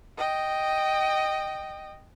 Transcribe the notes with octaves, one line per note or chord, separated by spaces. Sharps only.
D#5 G5